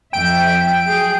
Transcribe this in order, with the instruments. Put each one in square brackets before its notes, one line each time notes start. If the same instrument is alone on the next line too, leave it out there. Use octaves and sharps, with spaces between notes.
[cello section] F2 E5 [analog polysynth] G5 D7
[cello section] F#3 G#4